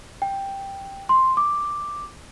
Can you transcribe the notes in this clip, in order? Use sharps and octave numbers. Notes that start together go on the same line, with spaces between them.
G5
C6
D6